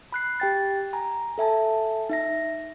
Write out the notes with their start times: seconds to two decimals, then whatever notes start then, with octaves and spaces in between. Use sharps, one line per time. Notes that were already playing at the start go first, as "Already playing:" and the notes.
0.12 B5 F#6 C7
0.40 G4 G5 A6
0.93 G#5 A#5
1.38 A4 E5 G#5 A5
2.09 D#4 E5 A#6